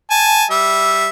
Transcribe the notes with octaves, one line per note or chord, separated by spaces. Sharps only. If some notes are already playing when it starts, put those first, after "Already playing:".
G#5 A5
G3 E5